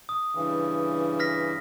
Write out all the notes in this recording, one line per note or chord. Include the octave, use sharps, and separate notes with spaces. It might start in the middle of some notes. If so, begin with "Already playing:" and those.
D#6
G2 C#3 E3
F6 A#6 B6